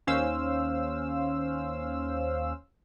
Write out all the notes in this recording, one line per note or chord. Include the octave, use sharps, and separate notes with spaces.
D#2 C#4 C5 F5 E6